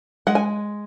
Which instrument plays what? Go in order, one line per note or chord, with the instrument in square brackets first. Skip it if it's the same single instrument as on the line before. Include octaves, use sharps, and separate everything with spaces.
[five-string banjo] G#3 F#5
G#5